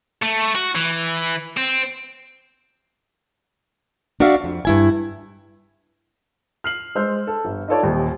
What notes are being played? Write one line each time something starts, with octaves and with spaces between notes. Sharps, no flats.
A3
F#4
E3
C4
D4 F#4 D5 E5 F5
F2
G2 E4 G#5
F6 C7 F#7
G#3 C5 E6 F6 G6
A4
G1
D#4 F4 A4 C#5 D5
D#1 D#2